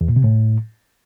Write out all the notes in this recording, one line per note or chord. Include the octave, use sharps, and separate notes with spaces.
E2
A#2
C3
A2